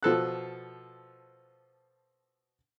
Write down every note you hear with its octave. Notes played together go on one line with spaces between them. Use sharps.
B2 F3 A4 F#6